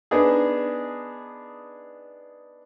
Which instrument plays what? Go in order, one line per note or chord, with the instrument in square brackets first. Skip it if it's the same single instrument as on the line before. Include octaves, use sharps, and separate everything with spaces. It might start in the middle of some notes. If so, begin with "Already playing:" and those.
[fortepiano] B3 D4 D#4 G#4